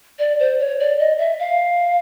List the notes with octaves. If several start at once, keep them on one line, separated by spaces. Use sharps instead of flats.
D5
C5
C#5
D5
D#5
E5
F5